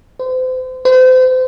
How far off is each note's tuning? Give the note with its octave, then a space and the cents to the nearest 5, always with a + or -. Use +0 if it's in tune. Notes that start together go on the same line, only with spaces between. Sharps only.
C5 -35
C5 -35